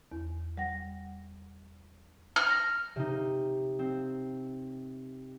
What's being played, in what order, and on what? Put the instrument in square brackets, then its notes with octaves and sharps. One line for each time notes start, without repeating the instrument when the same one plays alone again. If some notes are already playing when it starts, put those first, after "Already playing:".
[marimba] E2
G3 F#5 A#6
[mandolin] F6
[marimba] A#6
[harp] C3 D#4
C4